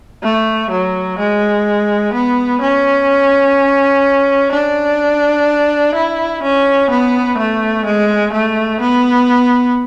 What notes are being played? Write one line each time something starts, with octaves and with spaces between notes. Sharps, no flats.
A3
F#3
G#3
B3
C#4
D4
E4
C#4
B3
A3
G#3
A3
B3